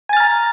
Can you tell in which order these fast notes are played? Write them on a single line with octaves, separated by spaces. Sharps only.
G#5 A6 F6 A#5